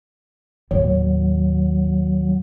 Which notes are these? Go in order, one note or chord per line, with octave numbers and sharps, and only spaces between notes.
D#2 A2 F#3